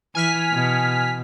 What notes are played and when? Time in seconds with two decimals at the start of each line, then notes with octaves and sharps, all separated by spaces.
0.15 E3 G#5 F6 B6
0.52 B2